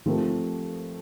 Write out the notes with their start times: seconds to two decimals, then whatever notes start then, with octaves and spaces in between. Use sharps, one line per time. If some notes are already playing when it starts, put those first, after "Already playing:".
0.06 F3 A3 C4 G4 A#4